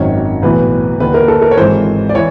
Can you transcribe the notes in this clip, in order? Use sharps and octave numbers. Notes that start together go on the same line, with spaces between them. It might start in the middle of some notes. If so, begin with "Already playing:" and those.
Already playing: G#1 F#2 D#3 C#5
B1 A2 E3 B4
D#2 D3 B4
A#4
A4
A#4
C#5
G#1 G#2 E3 C5
D5
E3 C#5